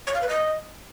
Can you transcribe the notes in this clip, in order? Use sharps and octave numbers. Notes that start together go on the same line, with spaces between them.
C#5
F5
B4
D#5